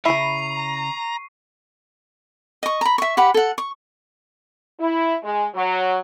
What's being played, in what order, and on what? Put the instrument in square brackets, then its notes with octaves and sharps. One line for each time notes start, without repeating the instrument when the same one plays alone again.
[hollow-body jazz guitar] C#3 E5 [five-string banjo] E4 B5 [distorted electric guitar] A#5 [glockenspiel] C#6 C7 D#7
[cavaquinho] D#5 C#6
A#5 B5
E5 C#6
G4 F#5 B5
A4 F#5
C#6
[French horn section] E4
G#3
F#3